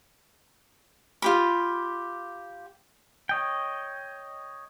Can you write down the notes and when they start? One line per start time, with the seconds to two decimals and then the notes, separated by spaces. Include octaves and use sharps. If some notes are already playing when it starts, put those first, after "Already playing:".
1.22 F4 G4 B5
3.29 C#5 D#5 G5